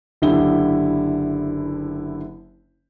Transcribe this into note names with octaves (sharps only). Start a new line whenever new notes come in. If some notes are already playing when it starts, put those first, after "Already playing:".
F#1 D3 E4 G4 G7